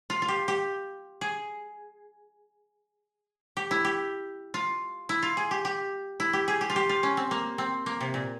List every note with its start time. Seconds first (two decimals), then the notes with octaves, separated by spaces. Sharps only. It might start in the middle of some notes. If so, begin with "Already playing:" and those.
0.10 F4
0.22 F4
0.28 G4
0.48 G4
1.21 G#4
3.57 G4
3.71 E4
3.84 G4
4.54 F4
5.09 E4
5.22 F4
5.37 G#4
5.51 G4
5.65 G4
6.20 E4
6.33 G4
6.48 G#4
6.61 G4
6.70 F4
6.76 G4
6.89 F4
7.03 C#4
7.17 C4
7.31 A#3
7.58 C4
7.86 A#3
8.01 C3
8.14 A#2